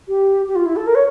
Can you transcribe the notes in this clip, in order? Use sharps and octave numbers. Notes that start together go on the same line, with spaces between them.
G4
G4
F4
E4
A4
A#4
C#5